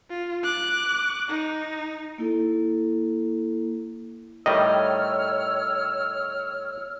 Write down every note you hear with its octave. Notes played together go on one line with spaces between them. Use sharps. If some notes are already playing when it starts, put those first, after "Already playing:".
F4
D6 F#6
D#4
A#3 E4 A4
A2 D#3 G3 C#5 D#5 E6 F6